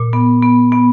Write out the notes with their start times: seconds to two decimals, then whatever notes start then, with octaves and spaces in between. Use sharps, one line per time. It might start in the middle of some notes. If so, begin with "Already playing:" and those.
Already playing: A#2
0.13 B3
0.43 B3
0.72 B3